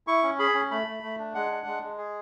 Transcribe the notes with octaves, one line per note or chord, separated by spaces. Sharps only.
E4 C#6
C#4
G#4 B5
C#4
A3 B5
A3
A3
D4
G#3 F#5
D4
G#3
G#3
G#4